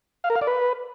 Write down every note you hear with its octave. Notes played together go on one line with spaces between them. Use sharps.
F5
A#4
F5
D5
B4